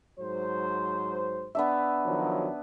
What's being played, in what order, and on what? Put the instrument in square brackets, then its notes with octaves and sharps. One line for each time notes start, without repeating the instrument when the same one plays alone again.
[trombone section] G#2 F#3 C5
[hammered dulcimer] B3 D4 E5
[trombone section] D#3 F3 F#3